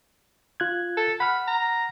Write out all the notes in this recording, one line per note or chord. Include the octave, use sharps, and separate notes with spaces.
F4 F#6 G#6
A4
F#5 B5 F6
A#5